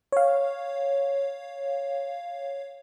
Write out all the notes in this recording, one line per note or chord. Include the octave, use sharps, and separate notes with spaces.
C#5 F5